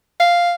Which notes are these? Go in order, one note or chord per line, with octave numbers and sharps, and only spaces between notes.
F5